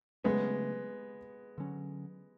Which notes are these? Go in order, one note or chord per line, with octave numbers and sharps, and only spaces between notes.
C#3 F#3 G#3 A3 B3 C#4
D3 F#3 C#4